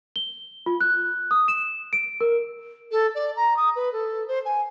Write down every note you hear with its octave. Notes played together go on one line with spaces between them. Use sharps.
G7
F4
F#6
D#6
E7
D7
A#4
A4
D5
A#5
D#6
B4
A4
C5
G#5